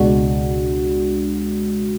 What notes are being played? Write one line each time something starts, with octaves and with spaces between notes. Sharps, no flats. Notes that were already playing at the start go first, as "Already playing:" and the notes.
Already playing: C#2 B2 G#3 D4 F#4